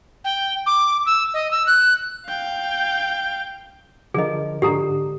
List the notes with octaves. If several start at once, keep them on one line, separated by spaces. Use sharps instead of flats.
G5
D6
E6
D#5
E6
F#6
F5 G5
D3 F3 G#4 A#4 D#5
G#2 D3 G4 A4 A#5